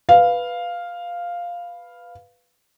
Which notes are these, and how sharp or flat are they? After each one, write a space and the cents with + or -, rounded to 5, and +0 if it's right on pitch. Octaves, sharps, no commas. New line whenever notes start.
B4 +0 F5 +0